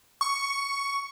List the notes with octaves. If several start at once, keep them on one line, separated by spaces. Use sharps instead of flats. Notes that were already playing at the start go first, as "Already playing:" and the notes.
C#6